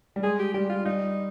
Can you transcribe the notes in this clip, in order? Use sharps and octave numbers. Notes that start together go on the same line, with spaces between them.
G3
G#3 G#4
G4
G3 G4
F4
G3 D#4